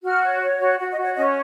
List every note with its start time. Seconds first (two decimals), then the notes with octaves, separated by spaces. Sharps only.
0.03 F#4 F6
0.23 C#5
0.41 C#5
0.60 F#4
0.79 F#4 F#5
0.91 D#5
0.97 F#4
1.04 C#5
1.16 C#4 D#5